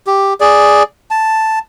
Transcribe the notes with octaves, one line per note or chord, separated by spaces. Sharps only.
G4
G#4 D5
A5